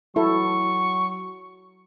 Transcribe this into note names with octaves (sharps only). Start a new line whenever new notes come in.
F#3 E4 A4 C#6